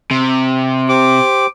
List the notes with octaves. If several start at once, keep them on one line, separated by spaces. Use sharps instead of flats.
C3
G4 C5 D6